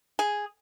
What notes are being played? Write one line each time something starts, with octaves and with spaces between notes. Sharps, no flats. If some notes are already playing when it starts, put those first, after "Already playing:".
G#4